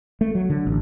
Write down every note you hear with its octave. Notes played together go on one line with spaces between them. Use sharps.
A3
F#3
D3
A1